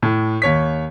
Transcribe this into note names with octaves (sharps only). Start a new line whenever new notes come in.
A2
D#2 C#5 B6